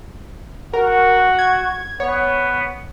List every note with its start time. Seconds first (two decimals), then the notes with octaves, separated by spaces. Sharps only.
0.73 F#4 A#4
1.39 G#6
2.00 B3 C#5